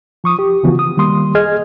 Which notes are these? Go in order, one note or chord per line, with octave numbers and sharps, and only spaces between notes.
F3 C#6 D#6
G4
C#3 E3 F3 B3 F4 F#4
D#6
D#3 G3 A#3 C6 D#6
G#4 D#5 F6 G#6